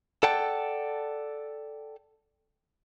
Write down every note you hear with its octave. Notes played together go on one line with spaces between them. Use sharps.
A4 D5 F#5 G5 A5